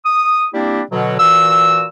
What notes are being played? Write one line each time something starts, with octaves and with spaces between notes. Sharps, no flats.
D#6
G3 A#3 C4 D4 E4 G4
B2 D3 F#3
A#2 E3 F#4 E6